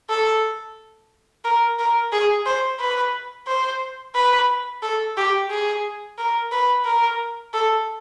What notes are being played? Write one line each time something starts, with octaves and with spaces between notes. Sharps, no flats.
A4
A#4
A#4
G#4
C5
B4
C5
B4
A4
G4
G#4
A#4
B4
A#4
A4